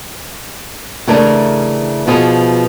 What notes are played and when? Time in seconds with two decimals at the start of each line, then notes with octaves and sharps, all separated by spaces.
1.08 C#3 E3 A3 D4 A#4
2.07 B2 F3 B3 G#4